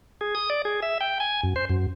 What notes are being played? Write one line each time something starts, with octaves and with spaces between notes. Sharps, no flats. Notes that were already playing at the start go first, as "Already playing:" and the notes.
G#4
D#6
D5
G#4
E5
G5
G#5
F#2
C5
F#2